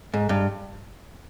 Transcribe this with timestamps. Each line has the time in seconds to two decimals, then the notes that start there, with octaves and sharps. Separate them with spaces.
0.14 G#2
0.29 G2